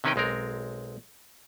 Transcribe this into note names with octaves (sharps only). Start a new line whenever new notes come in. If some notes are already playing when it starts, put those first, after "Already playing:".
C3 D#3 C#4 D#4 B4 G5
B1 G#3 C4 A#4